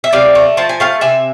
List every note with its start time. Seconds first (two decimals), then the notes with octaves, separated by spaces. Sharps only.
0.04 E5
0.13 C3 D5 F5
0.35 A3
0.57 F3 A5
0.69 G#5
0.80 A3 F5 A5
1.01 C3 E5 G#5